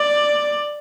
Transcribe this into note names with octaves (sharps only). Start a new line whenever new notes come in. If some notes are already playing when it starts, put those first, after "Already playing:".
Already playing: D5